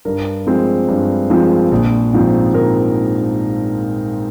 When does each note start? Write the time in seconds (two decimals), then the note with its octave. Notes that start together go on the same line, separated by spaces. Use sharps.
0.05 G2 A#4
0.47 F3 G#3 C4
0.88 G2
1.30 F3 G#3 C4
1.72 A#1
2.13 G#2 F3 C4
2.54 A#1 A#4